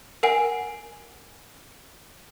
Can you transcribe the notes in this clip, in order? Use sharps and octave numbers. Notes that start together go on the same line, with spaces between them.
A#4 F#5 G#5